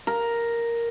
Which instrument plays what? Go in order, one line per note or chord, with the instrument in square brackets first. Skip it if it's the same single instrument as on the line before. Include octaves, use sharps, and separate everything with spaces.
[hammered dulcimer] A#4